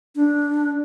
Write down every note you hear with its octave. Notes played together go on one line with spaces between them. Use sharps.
D4